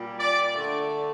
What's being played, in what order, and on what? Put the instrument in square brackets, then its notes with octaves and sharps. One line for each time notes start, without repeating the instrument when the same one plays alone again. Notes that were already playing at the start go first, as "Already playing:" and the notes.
Already playing: [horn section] A#2 G3
D5
D3 A3